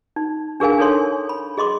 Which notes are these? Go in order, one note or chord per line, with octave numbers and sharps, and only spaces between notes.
D#4
D4 G#4 A#4 F5 G#5
D4 D#4 A4 C#5 C6
B5
G#4 D#5 C6 D6